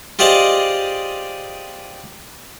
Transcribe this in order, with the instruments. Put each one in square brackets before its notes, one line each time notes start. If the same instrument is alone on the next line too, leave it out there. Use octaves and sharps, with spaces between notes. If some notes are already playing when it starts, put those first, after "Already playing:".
[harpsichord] F4 G4 G#4 C5 D5 D#5